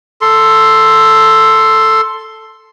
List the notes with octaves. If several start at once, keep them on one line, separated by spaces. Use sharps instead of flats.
A4 C6